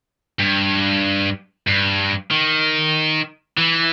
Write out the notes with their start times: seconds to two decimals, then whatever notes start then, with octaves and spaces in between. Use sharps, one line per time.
0.40 G2
1.67 G2
2.31 D#3
3.57 E3